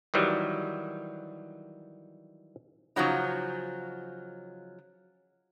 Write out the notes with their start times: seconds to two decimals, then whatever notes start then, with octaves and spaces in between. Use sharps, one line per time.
0.14 D#3 E3 F#3 G3
2.96 C#3 F3 F#3 D#4